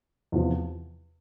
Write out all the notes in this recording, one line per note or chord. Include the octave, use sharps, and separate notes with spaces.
E2 C3 F3